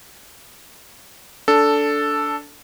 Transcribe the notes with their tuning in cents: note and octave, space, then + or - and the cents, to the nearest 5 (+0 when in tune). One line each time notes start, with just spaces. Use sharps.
D4 -15 A4 +0